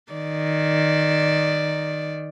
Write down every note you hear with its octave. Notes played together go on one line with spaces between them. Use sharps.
D#3 D5